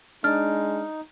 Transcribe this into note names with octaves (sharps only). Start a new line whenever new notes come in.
G#3 D4 D#4 F6